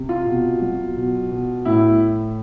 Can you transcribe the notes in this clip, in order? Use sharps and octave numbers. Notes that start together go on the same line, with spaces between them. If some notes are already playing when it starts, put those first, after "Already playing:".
Already playing: C3
F4
B2
F#3
B2
B2
A2 E4